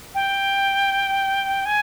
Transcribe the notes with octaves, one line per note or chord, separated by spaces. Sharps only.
G5
G#5